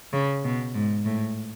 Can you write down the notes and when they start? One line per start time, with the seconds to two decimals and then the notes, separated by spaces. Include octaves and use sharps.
0.13 C#3
0.44 B2
0.75 G#2
1.05 A2